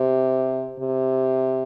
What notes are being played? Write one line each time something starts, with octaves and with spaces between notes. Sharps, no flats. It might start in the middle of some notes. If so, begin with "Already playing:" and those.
Already playing: C3
C3